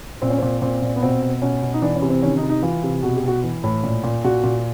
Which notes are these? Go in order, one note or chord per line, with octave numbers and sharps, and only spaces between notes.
A#2 C4
C#4
A#2 C4
A#2 C4
A#2
B3
B2 C4
B2
B2 C#4
B2
D#4
E3 D4
C#4
C3
C4
D#3 C#4
D#4
C3
D#4
E3 F4
C3
B2 F#4
G4
B2 F#4
E3
A2
A#2
A#2
A#2 F#4
A#2